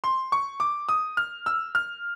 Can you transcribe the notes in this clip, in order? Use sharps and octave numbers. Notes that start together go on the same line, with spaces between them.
C6
C#6
D6
D#6
F6
E6
F6